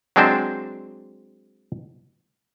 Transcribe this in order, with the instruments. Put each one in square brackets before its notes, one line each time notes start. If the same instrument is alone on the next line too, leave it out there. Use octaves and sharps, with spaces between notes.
[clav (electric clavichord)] F#3 G#3 C4 D4 C5